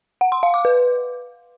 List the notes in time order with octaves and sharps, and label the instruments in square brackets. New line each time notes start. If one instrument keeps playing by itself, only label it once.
[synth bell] F#5
C6
F5
D6
B4